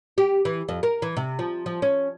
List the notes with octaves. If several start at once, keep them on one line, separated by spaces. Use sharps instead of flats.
G4
E3
F2
A#4
E3
C3
F3
F3
C#4